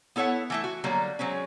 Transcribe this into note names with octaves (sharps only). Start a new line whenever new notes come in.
B3 E4 A4 C#5 F#5
E3 A3 E4
F#4
D3 F#3 G3 A#3
F#3 G#3 C4 C#4